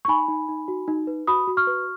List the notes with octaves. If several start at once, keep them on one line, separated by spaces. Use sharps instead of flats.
C#6
D#4 G#5 B5
D#4
D#4
F#4
D#4
B4
F#4 B5 D#6
F#4
C#6 F6
B4